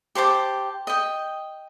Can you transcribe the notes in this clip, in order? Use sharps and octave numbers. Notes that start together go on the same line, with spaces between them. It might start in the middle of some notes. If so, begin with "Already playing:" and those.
G4 C5 A5 D6
D#5 G5